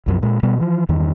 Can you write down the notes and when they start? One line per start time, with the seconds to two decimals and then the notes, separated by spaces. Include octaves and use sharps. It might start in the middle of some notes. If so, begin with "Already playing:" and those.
0.06 C2 F#2 F3
0.23 A#2 G#3
0.43 B2 G3 B3
0.59 E3 F3
0.89 E2 G2 D#3